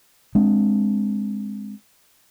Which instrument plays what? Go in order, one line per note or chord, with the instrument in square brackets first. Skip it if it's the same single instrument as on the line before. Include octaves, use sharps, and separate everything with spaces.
[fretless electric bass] G#3 C4 D4